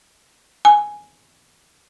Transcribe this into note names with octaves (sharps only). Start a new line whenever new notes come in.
G#5